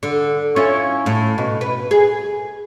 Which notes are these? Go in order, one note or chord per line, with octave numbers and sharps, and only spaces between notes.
D3
C#4 E4 F4
A2
B2
B4
G#4